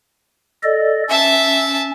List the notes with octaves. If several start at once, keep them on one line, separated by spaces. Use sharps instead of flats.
A4 D5 D#5
C#4 E5 A5